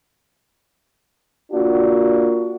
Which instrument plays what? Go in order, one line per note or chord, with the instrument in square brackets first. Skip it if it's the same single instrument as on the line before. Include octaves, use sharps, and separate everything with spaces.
[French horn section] A#3 D4 F4 F#4